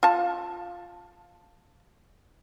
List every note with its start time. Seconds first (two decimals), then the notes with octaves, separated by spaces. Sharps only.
0.03 F4 A5